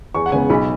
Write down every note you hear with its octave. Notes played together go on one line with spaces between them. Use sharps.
E2 C#6
F#5
C#3 G#3 B3 G#5
B1 B5